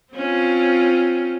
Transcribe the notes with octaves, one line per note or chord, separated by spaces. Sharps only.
C4 C#4 F4